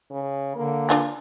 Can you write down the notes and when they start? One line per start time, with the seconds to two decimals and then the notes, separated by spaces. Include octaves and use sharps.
0.11 C#3
0.56 D3 A#3
0.89 D4 F4 G#4